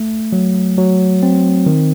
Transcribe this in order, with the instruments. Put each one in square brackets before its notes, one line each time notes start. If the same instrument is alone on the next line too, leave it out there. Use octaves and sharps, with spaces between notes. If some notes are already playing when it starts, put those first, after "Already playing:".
Already playing: [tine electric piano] A3
F#3
F#3
C4
D#3